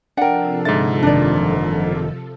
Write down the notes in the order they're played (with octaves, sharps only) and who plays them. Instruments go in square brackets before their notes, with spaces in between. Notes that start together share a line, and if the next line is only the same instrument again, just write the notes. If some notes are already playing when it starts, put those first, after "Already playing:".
[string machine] C3 F3 A4 [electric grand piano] D4 A#4 [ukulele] F#5 G5
[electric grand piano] G#2 D3 A6 [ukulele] D#5 E5
[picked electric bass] F#1 D#3 [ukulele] D4 D5